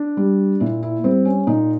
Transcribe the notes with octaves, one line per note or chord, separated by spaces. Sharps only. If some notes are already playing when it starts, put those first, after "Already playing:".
Already playing: D4
G3
A#2 E4
E4
G3 C4
C#4
A#2 D#4